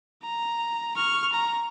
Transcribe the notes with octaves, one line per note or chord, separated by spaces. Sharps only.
A#5
C#6 F6
A#5